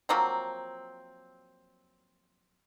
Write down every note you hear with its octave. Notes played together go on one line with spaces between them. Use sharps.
F3 F#3 A#3 C4